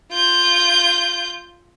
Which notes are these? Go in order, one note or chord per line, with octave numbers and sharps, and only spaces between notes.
F4 G6